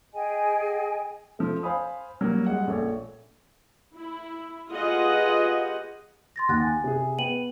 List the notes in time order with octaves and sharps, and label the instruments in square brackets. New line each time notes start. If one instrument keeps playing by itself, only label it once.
[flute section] G#4 D#5 G5 G#5
[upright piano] F3 A3
C5 F5 G#5 B5 D#6
F#3 G3 A#3
G3 G#3 F#5
A#1 A3 C#5
[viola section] E4
F4 G4 G#4 B4 D#5 F#5
[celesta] C6 A6 A#6
[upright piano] D#2 [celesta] F#5 F#6 A6
[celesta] G#5
[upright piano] C3 G#4
[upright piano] B3 [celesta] G5 D#7 F#7